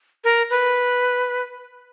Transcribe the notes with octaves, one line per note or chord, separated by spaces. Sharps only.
A#4
B4